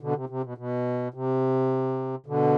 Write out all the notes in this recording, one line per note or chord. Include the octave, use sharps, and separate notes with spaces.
B2 D3
C3
C3
B2
B2
C3
B2 D3